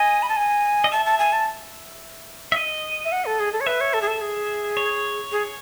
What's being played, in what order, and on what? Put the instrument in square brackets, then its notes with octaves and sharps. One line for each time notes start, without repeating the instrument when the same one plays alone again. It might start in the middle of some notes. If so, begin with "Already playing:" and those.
Already playing: [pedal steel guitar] D#5 [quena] G#5
[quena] B5
A5
G#5
[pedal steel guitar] D#5
[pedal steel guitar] E5 [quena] A5
[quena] A5
G#5
A5
[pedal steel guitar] E5
D#5
[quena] E5
F#5
A4
G#4
A4
C#5
[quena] B4 [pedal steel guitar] E5
[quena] C#5
A4
G#4
A4
G#4
[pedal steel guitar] C#5
[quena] G#4